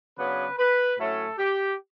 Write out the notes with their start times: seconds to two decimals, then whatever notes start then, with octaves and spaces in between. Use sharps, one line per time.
0.18 C#3 F#3 B3 D4 B4
0.59 B4
0.99 A2 F#3 A3 C#4 A4
1.39 G4